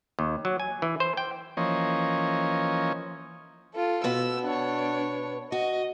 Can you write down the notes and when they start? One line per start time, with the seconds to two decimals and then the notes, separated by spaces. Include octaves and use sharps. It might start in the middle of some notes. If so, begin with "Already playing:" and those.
0.19 D#2
0.45 F#3
0.60 G#5
0.82 E3
1.00 C5
1.17 G5
1.57 E3 F3 A#3 C#4 C#5 D#5
3.74 F4 A4
4.04 B2 B3 E6
4.43 D4 C#5
5.52 F#4 D#5